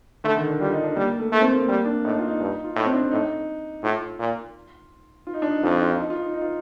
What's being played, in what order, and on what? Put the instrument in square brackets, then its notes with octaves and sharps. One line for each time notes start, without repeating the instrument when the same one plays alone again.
[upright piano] D3 [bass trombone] A3
[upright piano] D#3
D4
[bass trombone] G3 [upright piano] F4
[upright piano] D#4
D4
[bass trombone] G3 [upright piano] A#3
[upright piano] A3
[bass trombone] A3 [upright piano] A#3
[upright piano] C4
A#3
[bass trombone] G3 [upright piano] A#3
[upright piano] D4
[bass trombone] A2 [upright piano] D#4
[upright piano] F4
D#4
[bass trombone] G2
[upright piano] F4
[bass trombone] A2 [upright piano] D#4
[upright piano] C4
D4
[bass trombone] A2 [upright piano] D#4
[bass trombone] A2 [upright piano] F4
[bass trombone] A#2
[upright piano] F4
D#4
D4
D#4
[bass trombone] F2 [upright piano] F4
[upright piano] F4
F4
D#4
F4
D#4
D#4
F4